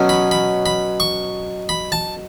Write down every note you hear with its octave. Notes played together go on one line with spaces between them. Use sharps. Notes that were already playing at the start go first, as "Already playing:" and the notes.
Already playing: B2 F#3 C#4
B5
B5
B5
C#6
B5
A5